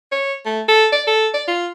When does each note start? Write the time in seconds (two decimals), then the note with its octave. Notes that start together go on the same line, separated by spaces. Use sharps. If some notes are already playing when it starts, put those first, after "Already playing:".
0.12 C#5
0.46 A3
0.68 A4
0.92 D5
1.07 A4
1.34 D5
1.48 F4